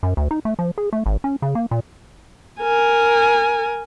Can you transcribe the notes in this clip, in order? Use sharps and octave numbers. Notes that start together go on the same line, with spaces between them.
F#2
D2
D#4
A3
F3
G#4
A3
G#1
C#4
C#3
A#3
A#2
A#4 G#5